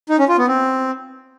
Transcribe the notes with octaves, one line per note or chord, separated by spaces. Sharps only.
D#4
C#4
F4
B3
C4